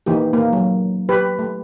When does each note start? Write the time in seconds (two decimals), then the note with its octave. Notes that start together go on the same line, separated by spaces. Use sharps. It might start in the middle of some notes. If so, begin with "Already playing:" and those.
0.06 E3 A#3 D#4 G4
0.33 A#3
0.53 F#3
1.09 G4 B4
1.39 A3